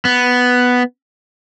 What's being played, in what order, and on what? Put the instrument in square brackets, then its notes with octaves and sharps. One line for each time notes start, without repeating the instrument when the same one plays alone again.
[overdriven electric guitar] B3